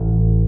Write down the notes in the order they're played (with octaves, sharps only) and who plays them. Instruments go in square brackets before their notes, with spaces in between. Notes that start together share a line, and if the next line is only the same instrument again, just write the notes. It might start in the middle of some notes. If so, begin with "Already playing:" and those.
Already playing: [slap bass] A1 E3